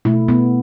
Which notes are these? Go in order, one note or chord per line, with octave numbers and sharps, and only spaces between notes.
B2 A3 E4
B3